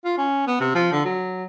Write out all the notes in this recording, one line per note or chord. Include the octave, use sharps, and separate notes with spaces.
F4
C#4
B3
C3
F3
D3
F#3